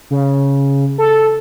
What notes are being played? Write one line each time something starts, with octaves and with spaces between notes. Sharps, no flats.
C#3
A4